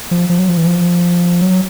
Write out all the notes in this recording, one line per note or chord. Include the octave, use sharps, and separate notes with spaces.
F3
F3
F#3
F3
E3
F3
F#3